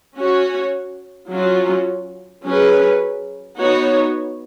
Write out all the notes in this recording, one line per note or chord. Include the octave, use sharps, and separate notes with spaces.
C#4 F#4 C#5
F#3 C#4 F4
F#3 C#4 G#4 B4
B3 D#4 F#4 C#5